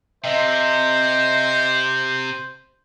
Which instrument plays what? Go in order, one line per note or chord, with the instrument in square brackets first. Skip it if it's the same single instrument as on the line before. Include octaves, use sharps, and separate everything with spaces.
[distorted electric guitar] C3 [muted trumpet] C5 [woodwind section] D#5 E5